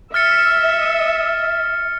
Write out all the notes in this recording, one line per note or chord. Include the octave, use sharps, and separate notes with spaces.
E5 F6 A6 C#7